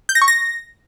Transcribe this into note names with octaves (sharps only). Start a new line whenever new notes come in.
G6
A#6
C#6
A#6